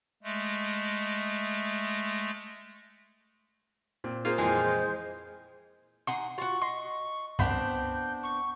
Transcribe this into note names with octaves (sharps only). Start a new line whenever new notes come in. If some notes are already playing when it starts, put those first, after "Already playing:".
G#3 A3
A#2 C4
A#3 F4 G#4 C5 G6
F2 A#2 E3 G#3
D#4 F#5 G#5 C6
F4 F#4 C#6
D#5 C6
C#2 G2 B3 C4 D4 B5 G6
C#6